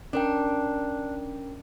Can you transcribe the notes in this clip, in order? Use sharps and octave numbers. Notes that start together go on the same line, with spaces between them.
C#4 D4 A#4 G5